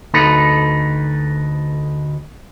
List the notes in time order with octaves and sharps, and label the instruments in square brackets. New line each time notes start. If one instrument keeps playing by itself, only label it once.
[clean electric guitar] D2 D#4 A4 B4